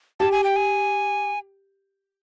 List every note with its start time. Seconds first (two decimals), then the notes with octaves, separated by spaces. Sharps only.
0.20 G4 A5
0.32 G#5
0.44 G5
0.56 G#5